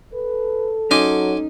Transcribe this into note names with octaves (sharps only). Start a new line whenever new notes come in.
A4 B4
F#3 C#4 D#4 G#5 C6 D6